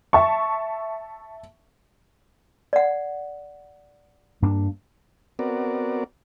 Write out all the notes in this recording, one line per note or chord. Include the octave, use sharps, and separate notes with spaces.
E5 A5 C#6
D5 F#5
G2 A#3 D4
B3 C4 F#4 A#4 D5